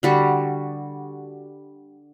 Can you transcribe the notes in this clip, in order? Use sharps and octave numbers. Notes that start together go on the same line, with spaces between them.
D3 G3 F#4